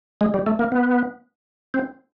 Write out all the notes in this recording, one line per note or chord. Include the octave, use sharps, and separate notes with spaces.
G#3
G3
A3
A#3
B3
C4